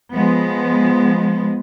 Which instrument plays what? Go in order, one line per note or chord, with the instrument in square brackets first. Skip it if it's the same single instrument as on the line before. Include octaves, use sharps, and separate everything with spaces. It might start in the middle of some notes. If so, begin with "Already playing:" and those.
[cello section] F3 G#3 B3